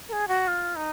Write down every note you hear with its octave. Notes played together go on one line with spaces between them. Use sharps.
A#4
G#4
F#4
F4
D#4